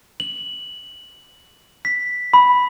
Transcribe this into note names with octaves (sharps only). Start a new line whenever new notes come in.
F#7
B6
B5